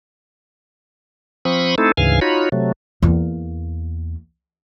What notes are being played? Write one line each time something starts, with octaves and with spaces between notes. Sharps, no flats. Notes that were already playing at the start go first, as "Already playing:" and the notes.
F3 C4 B5 C#6 D#6
A3 C4 D#4 E4 A4
D2 G#2 C#3 E3 F5 G#5
D#4 F4 F#4 C#5 B5
C3 F#3 A3
E2 A#3